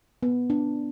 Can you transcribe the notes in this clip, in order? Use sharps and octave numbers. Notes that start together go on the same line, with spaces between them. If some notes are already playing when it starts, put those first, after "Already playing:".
B3
D4